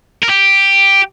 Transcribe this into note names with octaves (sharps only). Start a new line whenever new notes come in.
A#4
G4